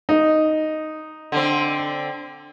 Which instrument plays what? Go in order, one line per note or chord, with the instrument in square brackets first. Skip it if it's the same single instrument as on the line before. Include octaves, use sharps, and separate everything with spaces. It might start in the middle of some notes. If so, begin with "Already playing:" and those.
[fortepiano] D#4
[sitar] D3 C4